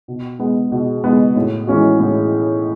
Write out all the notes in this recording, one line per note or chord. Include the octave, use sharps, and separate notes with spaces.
B2
G#3 B3
B2
G#3 B3
A2
E3 G#3 C#4 F#4
A2